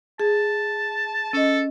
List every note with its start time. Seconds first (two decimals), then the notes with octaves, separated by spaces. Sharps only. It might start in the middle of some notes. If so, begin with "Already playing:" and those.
0.20 G#4 A5
1.33 C#4 A4 D#5